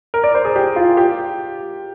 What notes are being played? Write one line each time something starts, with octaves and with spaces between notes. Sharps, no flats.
A#4
D5
C5
G#4
G4
F4
G4